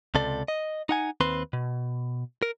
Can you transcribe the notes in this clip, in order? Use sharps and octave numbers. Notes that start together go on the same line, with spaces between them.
C#2 C3 A4 D5
D#5
D#4 F#5 G#5
D#2 C4 B4 C6
B2
A#4